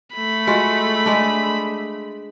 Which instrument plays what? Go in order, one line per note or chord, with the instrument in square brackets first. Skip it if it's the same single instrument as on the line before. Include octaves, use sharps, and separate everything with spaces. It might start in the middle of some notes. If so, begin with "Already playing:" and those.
[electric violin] A3 B5
[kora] G#3 F4 F#4
G#3 D4